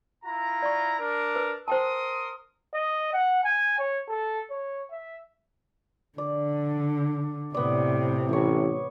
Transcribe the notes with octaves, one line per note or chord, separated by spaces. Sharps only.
E4 F4 A#5
D5 C#6
D4 A#4
B4
A#4 C5 G5 A5 C6 D#6
D#5
F#5
G#5
C#5
A4
C#5
E5
D3 D5
A2 C3 B3 D5
A1 C#5 G#5